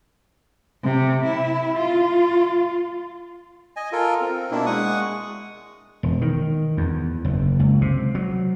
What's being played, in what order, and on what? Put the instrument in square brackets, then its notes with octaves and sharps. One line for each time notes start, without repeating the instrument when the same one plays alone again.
[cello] C3
E4
F4
[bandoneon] D#5 G#5
F4 A4 A#4
C4
B2 A#3 D4 E4
G#3 F#5 C#6 D#6
[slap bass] E1
D#3
E2
F#1
C#2
C3
F#3